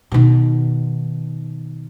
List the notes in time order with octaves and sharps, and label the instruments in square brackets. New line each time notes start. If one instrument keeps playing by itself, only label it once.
[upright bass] B2 D#3